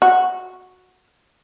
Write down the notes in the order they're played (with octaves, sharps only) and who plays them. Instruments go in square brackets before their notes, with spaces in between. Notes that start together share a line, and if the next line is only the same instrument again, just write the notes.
[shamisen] F#4